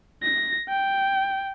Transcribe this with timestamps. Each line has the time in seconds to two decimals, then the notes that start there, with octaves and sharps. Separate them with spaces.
0.23 A#6
0.69 G5